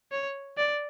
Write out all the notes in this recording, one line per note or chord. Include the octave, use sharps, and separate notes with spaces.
C#5
D5